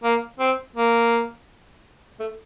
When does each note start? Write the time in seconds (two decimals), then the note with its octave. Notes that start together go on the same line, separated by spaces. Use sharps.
0.04 A#3
0.40 C4
0.76 A#3
2.20 A3